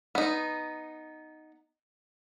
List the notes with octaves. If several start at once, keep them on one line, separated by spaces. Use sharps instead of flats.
B3 D#4